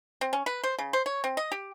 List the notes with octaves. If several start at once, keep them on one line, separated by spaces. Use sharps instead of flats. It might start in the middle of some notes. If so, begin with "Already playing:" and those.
C4
C#4
B4
C5
C#3
C5
C#5
C4
D#5
G4